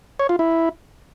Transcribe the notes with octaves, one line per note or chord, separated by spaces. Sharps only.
C#5
F4
E4